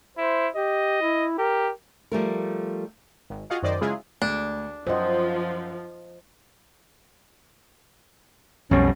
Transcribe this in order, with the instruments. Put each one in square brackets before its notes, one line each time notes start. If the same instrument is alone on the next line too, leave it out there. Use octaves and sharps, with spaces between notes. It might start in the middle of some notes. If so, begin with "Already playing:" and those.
[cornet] E4 [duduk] C5
[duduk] G4 [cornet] D#5
[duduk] E4
[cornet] G4 [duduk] A#4
[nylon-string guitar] F3 G3 A3 A#4
[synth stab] G#1
F4 F#4 G#4 D#5 F5 F#5
F#2 D#3 C5 D5 D#5
C#3 F#3 G#3 E4 F4 G#4
[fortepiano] D2 G#3 [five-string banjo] D4
[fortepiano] F#2 F#5 G5 [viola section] F3 [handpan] C5 D#5
[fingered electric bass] B1 [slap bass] F2 B2 G3 [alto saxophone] C#4